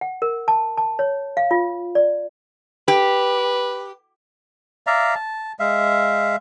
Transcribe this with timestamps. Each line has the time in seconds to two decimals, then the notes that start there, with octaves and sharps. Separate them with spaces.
0.01 F#5
0.22 A#4
0.48 A5
0.77 A5
0.99 C#5
1.37 F5
1.51 F4
1.95 D5
2.88 G4 B4
4.87 D5 E5 F5 A#5
5.15 A5
5.59 G#3 E5 F5